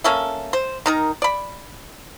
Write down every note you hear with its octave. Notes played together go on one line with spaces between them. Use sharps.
A#3 C#4 A4 E5
C5
D#3 D#4 A#4
D5 B5